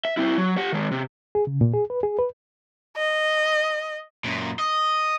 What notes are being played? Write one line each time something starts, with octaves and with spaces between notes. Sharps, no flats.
E5
C4 E4
F#3
G4 F#5
D#3 G#3
C3
G#4
C#3
A#2
G#4
B4
G#4
B4
D#5
F#2 A#2
D#5